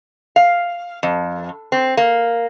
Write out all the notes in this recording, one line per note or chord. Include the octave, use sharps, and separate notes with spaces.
F5
F2
C4
A#3